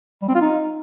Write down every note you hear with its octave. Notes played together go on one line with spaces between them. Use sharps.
G3
C4
F4
D#4